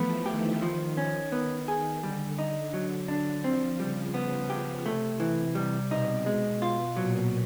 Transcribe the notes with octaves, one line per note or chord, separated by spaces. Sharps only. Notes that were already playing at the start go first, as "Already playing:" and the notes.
Already playing: E3 F3 A3 B3
D#3 G4
F3
C#4
B3
G#4
D3 G3
D#4
F#3
D4
F3 C4
C#3 G3
C#3 B3
G4
C3 A3
C3 E3
C3 G3
B2 D#4
G#3
F4
A#2 F#3